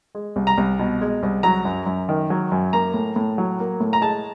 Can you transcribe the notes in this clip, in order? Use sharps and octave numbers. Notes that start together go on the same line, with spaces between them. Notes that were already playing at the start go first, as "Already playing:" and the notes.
G#3
C2
A#5
C2
B2
G#3
C2
F#3 A#5
F#2
F#2
D#3
F#3
F#2
A#3 A#5
A2
A2
F#3
A#3
A2
A#5
G#3 A5